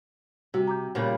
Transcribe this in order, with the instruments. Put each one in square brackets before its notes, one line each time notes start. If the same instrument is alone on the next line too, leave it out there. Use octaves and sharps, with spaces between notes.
[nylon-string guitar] C3 [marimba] G3 F#4
[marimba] A#5 D6 G6
[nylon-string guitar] A#2 C#3 G3